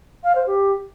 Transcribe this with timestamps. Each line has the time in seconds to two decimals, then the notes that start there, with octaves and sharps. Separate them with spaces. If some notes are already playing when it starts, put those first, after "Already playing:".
0.24 F5
0.35 C5
0.47 G4